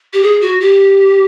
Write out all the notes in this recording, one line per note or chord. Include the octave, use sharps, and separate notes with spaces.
G4
G#4
F#4
G4